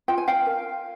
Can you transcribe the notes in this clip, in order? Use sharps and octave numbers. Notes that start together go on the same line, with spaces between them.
F4 G5
G#5
F5 G5
A#4